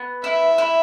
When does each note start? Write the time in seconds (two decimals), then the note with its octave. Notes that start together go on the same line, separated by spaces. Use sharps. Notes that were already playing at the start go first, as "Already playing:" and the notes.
Already playing: B3
0.24 E4 E5
0.58 E4